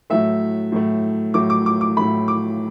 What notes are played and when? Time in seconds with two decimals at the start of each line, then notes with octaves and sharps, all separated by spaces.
0.10 A2 F#3 A3 E5
0.72 A2 F#3 A3
1.34 A2 F#3 A3 D6
1.50 D6
1.66 D6
1.81 D6
1.97 A2 F#3 A3 B5
2.28 D6